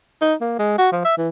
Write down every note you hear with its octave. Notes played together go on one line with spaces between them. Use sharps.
D#4
A#3
G#3
F#4
F3
E5
E3